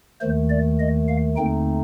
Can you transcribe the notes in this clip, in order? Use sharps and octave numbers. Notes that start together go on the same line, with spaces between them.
D#2 D#3 A3 C5
D5
D#5
F5
D#2 D3 A3 C4 D#4 G5